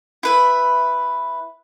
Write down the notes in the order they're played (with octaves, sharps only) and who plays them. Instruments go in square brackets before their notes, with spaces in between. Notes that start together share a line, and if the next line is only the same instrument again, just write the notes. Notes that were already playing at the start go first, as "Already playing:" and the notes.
[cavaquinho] E4 B4 E5